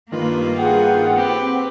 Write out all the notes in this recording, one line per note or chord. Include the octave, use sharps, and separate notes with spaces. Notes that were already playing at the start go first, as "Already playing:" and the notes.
G2 D#3 A#3 F4 B4
G#4 B4 F#5 G5
C4 G4 B4